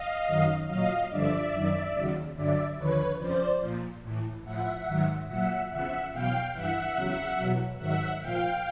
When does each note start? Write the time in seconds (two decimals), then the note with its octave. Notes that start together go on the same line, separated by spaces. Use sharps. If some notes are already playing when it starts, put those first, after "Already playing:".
Already playing: D#5 F5
0.27 F#2 D#3 F#3
0.67 A#2 F#3 D#5 F5
1.10 G2 D3 F3 D5 E5
1.51 F#2 D#3 F#3
1.93 D#2 C#3 F#3
2.35 G2 D3 F#3 D5 E5
2.77 D#2 D3 F3 B4 C#5
3.19 F2 C#3 F3 C5 D5
3.61 A#2 F3
4.02 A2 E3
4.44 A2 F3 E5 F#5
4.86 G#2 D#3 F#3
5.27 A#2 F#3 E5 F#5
5.69 E2 C#3 F3 E5 F#5
6.11 E2 B2 F#3 F5 G5
6.53 G2 E3 E5 F#5
6.94 E2 C#3 F#3
7.36 E2 B2 F#3
7.78 G#2 D#3 F#3 E5 F#5
8.20 A#2 F3 F5 G5